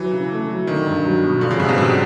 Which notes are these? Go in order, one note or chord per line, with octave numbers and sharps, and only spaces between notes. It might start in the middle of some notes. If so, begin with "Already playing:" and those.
Already playing: E3 F#3
C#3
A3
F#3
D3 D#3
G2
F#3
B2
D3 F3
C#3
G#2 C3
B2
C3 G3